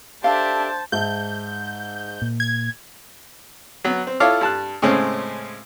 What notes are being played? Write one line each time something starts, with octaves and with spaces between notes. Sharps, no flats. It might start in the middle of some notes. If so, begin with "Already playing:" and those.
D4 G4 A4 C5 E5 F5 A5
G#2 E5 A5 G6
A#2
G#6
F#3 B3
C4
E4 F4 A4 C#5 F5 D6
G2 A5 F#6
A2 C#3 G#3 C4 C#4